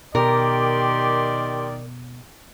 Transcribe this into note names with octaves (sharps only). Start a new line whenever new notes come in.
B2 D#3 G4 A#4 D5 C6